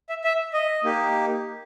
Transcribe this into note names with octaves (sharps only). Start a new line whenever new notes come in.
E5
E5
D#5
A#3 D#4 G4